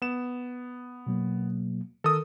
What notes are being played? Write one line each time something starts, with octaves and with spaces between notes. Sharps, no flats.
B3 E7
B2 F#3 A#3
D#3 A4 A#4 D#6